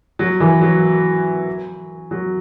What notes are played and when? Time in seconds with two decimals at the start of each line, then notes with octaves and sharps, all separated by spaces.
0.19 F#3
0.40 E3
0.61 F#3
2.11 F#3